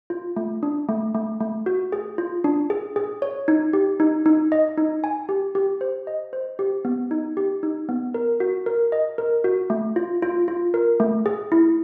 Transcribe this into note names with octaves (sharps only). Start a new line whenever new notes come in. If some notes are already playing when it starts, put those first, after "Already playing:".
F4
A3
D4
A3
A3
A3
F#4
G#4
F4
D4
G#4
G#4
C#5
D#4
G4
D#4
D#4
D#5
D#4
G#5
G4
G4
C5
D#5
C5
G4
B3
D#4
G4
D#4
B3
A#4
F#4
A#4
D#5
A#4
F#4
A3
F4
F4
F4
A#4
A3
G#4
E4